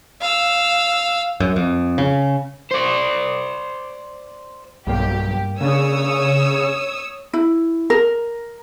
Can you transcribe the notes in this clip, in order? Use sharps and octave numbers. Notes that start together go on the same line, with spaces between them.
F5 E6
F#2
F2
C#3
C5 D5
B1 G2 A#3 G4
C#3 A#3 D4 C#5 D#6 E6
E4
A#4